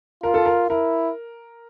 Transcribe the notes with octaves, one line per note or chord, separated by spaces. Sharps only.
F4 A#4
A4
A#4
E4 A#4